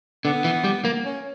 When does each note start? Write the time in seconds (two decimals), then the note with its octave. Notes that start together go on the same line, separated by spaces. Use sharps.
0.25 D3 B3
0.44 E3
0.64 G3
0.85 A#3
1.05 C#4